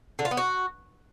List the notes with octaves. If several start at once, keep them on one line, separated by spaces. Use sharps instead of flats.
D3
F4
B3
F#4